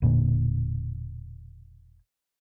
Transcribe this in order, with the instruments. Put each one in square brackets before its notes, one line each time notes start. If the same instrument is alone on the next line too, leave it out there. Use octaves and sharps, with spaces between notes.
[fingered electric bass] E1 A#2 D3